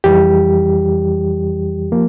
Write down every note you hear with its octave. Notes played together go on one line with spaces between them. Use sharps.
F2 E3 G3 G4
F3 A#3